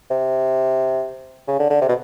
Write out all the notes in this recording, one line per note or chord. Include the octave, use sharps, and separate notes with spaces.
C3
C#3
D3
D3
C3
B2